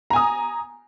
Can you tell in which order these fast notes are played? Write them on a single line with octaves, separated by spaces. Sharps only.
A#5 G#5 D#6